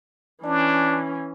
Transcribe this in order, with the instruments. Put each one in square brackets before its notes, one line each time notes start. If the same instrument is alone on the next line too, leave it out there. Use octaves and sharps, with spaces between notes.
[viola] E3 C#4 [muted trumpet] D4